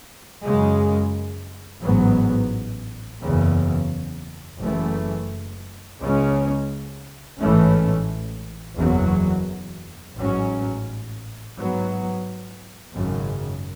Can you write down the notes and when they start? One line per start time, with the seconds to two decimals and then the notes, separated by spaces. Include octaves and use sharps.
0.43 F#2 C#3 G#3
1.82 A1 G#2 F#3 B3
3.20 F#1 E2 C#3
4.59 F#1 F#2 E3 A3
5.99 C#2 C#3 G#3 C#4
7.38 A1 G#2 E3 A3 C#4
8.77 F#1 E2 B2 F#3
10.16 A1 G#2 F#3 C#4
11.55 G#2 F#3 B3
12.94 G#1 F#2 C#3